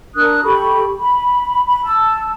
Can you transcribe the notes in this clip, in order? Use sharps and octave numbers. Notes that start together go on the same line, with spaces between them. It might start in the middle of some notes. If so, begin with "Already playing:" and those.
D4 A#4 D#6 F#6
G4 A4 B5 C#6
B5
B5
A5 E6